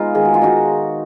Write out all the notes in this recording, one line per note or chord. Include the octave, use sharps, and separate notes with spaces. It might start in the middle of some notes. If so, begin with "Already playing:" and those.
Already playing: G#3 B3 D#4 F4
D#3 G#4
F#4
F4
D#4 F#4